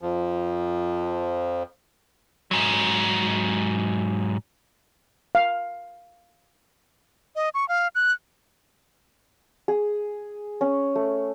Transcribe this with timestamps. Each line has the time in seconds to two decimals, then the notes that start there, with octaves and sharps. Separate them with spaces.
0.01 F2 F3
2.51 G#2 F#3
5.35 F5
7.36 D#5
7.54 C#6
7.69 F5
7.95 F#6
9.68 G#4
10.61 C#4
10.96 A3